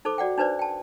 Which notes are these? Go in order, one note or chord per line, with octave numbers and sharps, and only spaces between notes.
D#4 A4 C5 D6
F#4 D5 F#5 G5
D4 D#4 B4 C5 D5
G5 A5